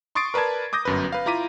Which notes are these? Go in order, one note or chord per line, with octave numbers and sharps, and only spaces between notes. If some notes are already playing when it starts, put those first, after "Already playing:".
C6 C#6 D#6 A6 C7 D7
A#4 B4 D5 A5 G#6
D6 D#6 G6 A#6
G1 F#2 B4
B4 F5
E4 F4 A#5 D6 B6 D#7